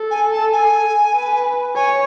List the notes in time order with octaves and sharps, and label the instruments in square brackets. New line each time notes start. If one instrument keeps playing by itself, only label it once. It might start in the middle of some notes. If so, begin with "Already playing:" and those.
Already playing: [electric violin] A4
[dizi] G#5
A5
G#5
[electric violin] B4
[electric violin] C#5 [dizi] G#5